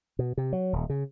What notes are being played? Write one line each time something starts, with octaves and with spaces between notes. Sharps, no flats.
B2
C3
F#3
D#1
C#3